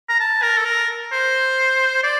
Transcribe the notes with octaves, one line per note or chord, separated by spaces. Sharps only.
A#5
A5
A#4
A4
A#4
C5
D5